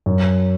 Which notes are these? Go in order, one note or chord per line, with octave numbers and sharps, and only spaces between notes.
F#2